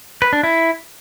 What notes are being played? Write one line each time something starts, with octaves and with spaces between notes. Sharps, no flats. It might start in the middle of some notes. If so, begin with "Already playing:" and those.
B4
D4
E4